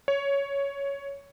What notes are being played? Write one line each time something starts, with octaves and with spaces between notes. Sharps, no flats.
C#5